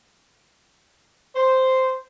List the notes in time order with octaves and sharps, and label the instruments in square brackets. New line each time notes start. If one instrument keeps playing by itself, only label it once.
[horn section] C5